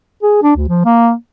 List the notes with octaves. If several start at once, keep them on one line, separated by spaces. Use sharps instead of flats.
G#4
D4
D2
F3
A#3